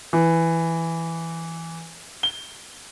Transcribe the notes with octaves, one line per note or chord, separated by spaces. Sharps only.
E3
G7